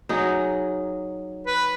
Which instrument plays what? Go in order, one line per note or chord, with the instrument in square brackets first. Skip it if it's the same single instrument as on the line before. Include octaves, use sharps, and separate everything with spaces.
[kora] F#3 D#4 G#4
[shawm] B4